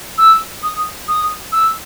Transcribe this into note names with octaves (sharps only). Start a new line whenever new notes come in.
E6
D#6
D#6
E6